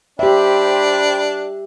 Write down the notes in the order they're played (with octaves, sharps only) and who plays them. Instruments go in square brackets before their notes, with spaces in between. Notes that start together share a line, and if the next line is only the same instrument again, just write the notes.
[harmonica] D4 [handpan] G4 E5 [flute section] C5 G5 B5